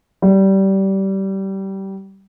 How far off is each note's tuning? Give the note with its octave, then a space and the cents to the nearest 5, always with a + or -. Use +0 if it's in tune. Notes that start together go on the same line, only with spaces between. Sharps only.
G3 -20